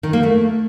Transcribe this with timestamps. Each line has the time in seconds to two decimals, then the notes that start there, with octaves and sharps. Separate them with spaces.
0.03 D#3
0.13 A#3
0.23 A3